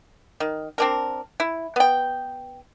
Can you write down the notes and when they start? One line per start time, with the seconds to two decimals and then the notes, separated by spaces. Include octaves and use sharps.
0.40 D#3
0.78 C4 D4 A#4
1.40 E4
1.76 B3 G5